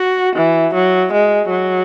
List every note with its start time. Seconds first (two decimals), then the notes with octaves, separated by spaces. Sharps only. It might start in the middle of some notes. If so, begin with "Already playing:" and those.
Already playing: F#4
0.36 E3
0.74 F#3
1.12 G#3
1.50 F#3